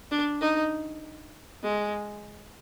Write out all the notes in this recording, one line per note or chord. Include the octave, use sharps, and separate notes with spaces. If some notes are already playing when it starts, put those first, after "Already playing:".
D4
D#4
G#3